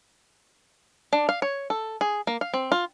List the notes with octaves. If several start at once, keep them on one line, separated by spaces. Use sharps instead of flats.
D4
F5
C#5
A4
G#4
A#3
F5
C4
F4